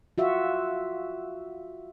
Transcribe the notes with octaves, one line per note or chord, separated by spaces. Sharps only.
F4 F#4 E5